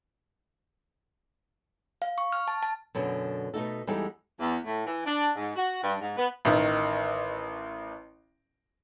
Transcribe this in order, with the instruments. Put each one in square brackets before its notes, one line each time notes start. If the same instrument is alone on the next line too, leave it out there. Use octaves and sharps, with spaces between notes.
[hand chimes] F5
C#6
F6
A5
A5
[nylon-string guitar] F#2 B2 D3
B2 A3 D#4 A4
E2 G3 G#3 D#4 E4 A4
[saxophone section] E2
A2
E3
D4
G#2
F#4
G2
G#2
B3
[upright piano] A1 D#3